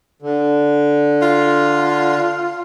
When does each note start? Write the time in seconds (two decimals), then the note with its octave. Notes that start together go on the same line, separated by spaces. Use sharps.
0.22 D3
1.22 F4